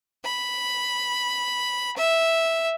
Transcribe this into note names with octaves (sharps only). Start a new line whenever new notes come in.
B5
E5